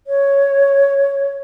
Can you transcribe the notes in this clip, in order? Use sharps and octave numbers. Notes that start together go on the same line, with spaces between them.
C#5